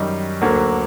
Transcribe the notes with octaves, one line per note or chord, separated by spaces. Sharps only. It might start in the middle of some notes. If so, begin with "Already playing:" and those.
Already playing: F#2 D#3 G3
D2 D3 F#3 A#3